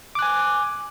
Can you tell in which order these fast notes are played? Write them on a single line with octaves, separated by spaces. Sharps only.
D6 F#6 G#5